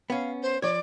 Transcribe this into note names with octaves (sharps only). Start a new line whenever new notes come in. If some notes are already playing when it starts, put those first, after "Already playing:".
B3 C#4 F5
C5
F3 C#5 D5